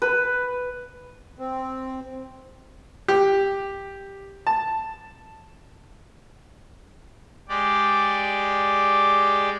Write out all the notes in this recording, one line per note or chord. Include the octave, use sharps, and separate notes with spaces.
B4
C4
G4
A5
G#3 G4 D5